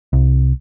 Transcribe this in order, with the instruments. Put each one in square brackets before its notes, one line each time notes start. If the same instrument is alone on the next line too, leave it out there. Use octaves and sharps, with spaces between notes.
[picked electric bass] C2